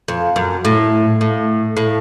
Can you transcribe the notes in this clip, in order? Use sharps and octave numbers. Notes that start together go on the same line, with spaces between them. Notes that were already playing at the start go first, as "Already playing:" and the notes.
F2
F#2
A2
A2
A2